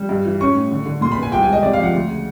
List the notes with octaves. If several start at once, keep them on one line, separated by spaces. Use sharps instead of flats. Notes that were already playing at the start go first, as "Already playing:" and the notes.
Already playing: G3
G2
E3
C#4 C#6
A2
D3
D3
A#2 C6
B5
B3
G#5
C2 G5
G#5
G#3
D#5
C3 D5
F5
F3 F#5
D2
C#3